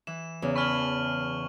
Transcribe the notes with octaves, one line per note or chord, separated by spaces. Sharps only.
E3 E7
E2 C#3
A5 B5 C#6 F6 F#7